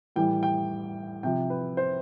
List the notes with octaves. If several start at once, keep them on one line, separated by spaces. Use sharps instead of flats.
A2 E3 G3 G5
G5
C3 F3 G5
B4
C5